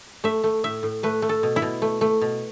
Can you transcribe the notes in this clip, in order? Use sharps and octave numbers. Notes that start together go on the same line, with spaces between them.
A3 E5
A3
A2 E5
A2
A3 B4
A3
A4
B2
E4
B2
A3
A3
B2